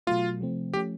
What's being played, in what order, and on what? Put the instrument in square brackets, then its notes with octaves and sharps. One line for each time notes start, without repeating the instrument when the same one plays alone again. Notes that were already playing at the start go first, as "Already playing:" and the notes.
[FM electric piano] B2 F#3 A3 [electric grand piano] F4
[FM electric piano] C3 F3 A3 C4
[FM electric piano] F3 A3 C#4 [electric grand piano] G4